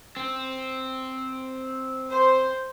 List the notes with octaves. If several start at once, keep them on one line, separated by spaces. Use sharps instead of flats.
C4
C5